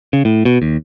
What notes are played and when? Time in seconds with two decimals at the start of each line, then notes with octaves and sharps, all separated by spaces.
0.13 C#3
0.25 A2
0.45 B2
0.62 D#2